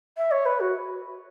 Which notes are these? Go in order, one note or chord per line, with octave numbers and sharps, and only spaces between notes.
E5
C#5
B4
F#4